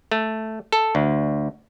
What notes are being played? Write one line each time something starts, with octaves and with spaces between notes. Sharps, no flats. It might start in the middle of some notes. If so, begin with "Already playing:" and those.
A3
A4
D2